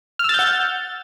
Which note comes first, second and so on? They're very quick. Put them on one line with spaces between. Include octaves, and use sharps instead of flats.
F6 E6 A6 G6 F#5